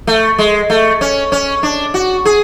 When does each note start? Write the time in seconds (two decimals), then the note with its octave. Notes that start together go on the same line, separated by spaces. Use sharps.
0.07 A3
0.38 G#3
0.70 A3
1.01 C#4
1.32 C#4
1.63 D4
1.94 F#4
2.25 G#4